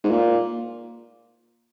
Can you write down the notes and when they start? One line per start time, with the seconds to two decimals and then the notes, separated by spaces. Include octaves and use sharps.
0.04 G#2
0.10 A#2